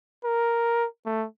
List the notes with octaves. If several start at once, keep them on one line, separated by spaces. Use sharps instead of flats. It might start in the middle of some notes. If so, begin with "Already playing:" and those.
A#4
A3